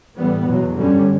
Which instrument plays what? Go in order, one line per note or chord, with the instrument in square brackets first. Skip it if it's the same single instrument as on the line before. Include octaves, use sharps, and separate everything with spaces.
[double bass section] A2 E3 G3 B3
E2 B2 F#3
G2 D3 G3 C#4